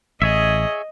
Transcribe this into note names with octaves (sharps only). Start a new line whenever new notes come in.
A1 G#4 C#5 D#5 E5